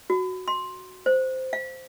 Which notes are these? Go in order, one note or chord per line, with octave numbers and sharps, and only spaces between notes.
F#4
C6
C5
F5